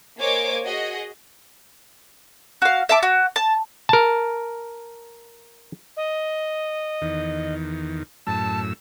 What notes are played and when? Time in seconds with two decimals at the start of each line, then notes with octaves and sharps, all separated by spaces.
0.19 A#3 C5 C#5 D#5 G#5 D6
0.65 F#4 G#4 D#5
2.62 F#4 F5
2.89 E5 A5 D6
3.03 F#4
3.36 A5
3.89 A#4 A5
5.97 D#5
7.01 E2 D#3
8.27 F#2 A2 A5 E6